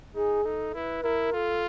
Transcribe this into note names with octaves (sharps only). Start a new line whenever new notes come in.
D#4 G#4
D#4 A4
E4 B4
E4 A#4
F4 A4